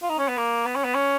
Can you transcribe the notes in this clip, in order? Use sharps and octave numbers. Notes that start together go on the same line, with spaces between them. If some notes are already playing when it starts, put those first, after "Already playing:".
F4
D#4
C#4
B3
A#3
B3
C#4
B3
C#4